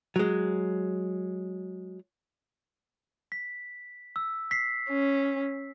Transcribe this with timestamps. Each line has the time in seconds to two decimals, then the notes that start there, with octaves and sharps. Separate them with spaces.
0.16 F#3 G#3
3.32 B6
4.16 E6
4.51 B6 C7
4.89 C#4